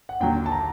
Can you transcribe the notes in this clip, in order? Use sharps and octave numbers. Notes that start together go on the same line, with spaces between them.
F#5
D#2 D3 F#3 G5
A5
A#5